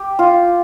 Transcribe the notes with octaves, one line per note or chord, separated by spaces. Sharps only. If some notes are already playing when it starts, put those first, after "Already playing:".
Already playing: G4
F4